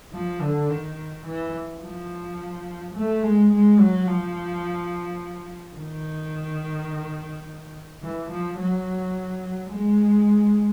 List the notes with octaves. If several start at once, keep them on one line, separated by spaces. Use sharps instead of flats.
F3
D3
D#3
E3
F3
A3
G#3
G#3
F#3
F3
D#3
E3
F3
F#3
G#3